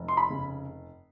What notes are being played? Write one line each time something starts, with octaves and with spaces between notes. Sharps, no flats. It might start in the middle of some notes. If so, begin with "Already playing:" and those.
Already playing: F1
C6
B5
C#3